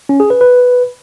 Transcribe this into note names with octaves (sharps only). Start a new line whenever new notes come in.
C#4
G#4
B4
B4